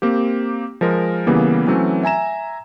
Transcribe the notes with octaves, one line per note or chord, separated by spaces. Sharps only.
A#3 C4 G4
F3 G#3 A#4
C#3 E3 G3 A#3 B3
E3 F#3 A3 C4 C#4
E5 G#5 A#5 E7